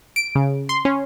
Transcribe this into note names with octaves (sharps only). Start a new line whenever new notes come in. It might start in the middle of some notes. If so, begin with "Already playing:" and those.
D7
C#3
C6
C#4